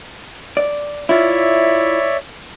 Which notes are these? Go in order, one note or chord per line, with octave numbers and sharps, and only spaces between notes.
D5
E4 F4 C#5 D5 E5